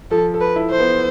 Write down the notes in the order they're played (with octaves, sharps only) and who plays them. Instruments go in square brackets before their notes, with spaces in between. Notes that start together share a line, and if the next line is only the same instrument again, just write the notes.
[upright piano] F3 [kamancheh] A4
[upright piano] A4
[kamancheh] B4
[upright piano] E4
[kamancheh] C5
[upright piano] B3